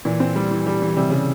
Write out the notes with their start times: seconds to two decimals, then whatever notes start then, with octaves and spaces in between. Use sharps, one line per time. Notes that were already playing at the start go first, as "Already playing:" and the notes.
0.05 A#2 E3
0.20 C4
0.36 G3
0.51 E3
0.67 G3
0.82 E3
0.97 C3 G3
1.10 C#3 G3